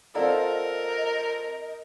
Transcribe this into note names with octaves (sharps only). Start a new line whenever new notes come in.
C4 F4 A4 A#4 D5 D#5 F#5 A#5